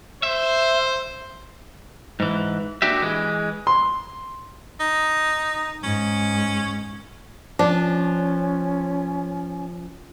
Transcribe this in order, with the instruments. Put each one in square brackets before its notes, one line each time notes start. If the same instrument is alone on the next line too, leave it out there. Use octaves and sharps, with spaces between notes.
[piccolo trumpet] C5 [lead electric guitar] E5
[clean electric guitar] G#2 E3
A#2 D4 F#4 G4 E5
E3 G#3
[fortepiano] C6
[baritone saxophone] D#4
[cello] G#2 [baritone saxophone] C#4
[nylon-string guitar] F3 [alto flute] C#4 [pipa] D4